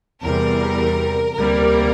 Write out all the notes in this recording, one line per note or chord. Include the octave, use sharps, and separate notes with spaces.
E2 C3 G3 A#4
D2 C3 G3 A#3 A#4